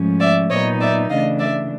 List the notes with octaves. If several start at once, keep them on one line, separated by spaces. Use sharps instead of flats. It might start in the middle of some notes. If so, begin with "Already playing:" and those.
Already playing: G#2 F3 A3 C#4
D5 E5
A#2 F#3 B3 D#4 C#5 D#5
D5 E5
C#3 E3 A3 D4 D#5 F5
D5 E5